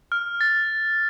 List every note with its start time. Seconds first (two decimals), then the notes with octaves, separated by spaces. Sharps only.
0.12 F6
0.41 A6